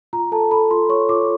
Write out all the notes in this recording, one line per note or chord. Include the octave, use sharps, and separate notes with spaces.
F4 A#5
A4 A5
A4 B5
F4 C6
C#5 C#6
F4 D6